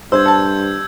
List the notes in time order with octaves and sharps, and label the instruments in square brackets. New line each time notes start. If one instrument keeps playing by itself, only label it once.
[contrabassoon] G2 [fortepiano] C5 [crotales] E6 G6 G#6
[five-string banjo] A4 A5